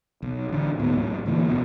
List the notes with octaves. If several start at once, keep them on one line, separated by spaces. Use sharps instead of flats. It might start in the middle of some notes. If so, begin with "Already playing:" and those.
B1
A1 D3
D1 D2 G#2 B3
B1 F#2 A2
D2 A#2 E3
F1 B2